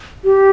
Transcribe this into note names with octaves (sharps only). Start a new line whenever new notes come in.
G4